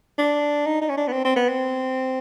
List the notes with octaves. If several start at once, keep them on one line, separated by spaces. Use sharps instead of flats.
D4
D#4
D#4
C#4
D4
B3
C4
C4
B3
C4